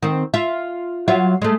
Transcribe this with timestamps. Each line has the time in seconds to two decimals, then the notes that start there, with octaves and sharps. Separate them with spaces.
0.02 D#3 C4
0.34 F4 E5
1.08 F#3 F4 E5
1.42 G#3 A3